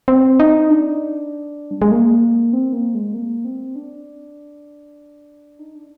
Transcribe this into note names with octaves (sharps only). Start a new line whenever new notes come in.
C4
D#4
D4
G3
G#3
A#3
C4
A#3
G#3
A#3
C4
D4
D#4
D4